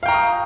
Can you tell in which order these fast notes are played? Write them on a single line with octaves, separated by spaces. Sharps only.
F5 G5 A#5 C#6 D#6